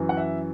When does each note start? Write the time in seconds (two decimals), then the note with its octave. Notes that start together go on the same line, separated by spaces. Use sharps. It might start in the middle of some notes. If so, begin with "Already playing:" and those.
Already playing: F#2 E3
0.09 F#5
0.17 E5